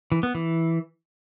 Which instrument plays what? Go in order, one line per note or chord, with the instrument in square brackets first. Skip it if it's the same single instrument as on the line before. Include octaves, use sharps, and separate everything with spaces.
[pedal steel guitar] E3
B3
E3